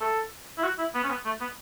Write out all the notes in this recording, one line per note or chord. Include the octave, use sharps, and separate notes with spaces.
A4
E4
F#4
E4
B3
C#4
B3
A3
B3